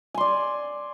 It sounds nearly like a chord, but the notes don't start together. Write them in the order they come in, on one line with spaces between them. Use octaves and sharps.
G#5 C6 D5